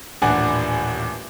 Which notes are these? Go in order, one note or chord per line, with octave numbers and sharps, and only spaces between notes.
D#1 A1 D4 F#5 G#5